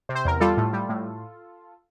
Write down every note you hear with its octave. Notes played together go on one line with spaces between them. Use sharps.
C3
C5
E2 A#4
G3 F4 A4
A2
G3
A2